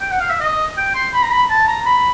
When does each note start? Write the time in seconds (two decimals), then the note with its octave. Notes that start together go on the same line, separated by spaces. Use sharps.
0.01 G5
0.11 F#5
0.20 F5
0.30 E5
0.41 D#5
0.77 G5
0.95 C6
1.13 B5
1.23 A#5
1.31 B5
1.50 A5
1.68 A#5
1.86 B5